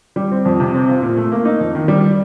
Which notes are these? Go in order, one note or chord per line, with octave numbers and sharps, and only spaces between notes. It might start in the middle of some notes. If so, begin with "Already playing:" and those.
G3
C4
F2
C3
C4
F4
A#2
A3
A#3
D#4
F2
D#3
G3